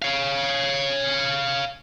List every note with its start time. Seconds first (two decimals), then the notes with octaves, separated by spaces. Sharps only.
0.02 C#5 F5